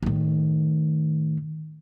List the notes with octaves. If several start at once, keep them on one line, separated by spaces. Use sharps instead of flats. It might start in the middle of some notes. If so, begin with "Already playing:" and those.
A2 D#3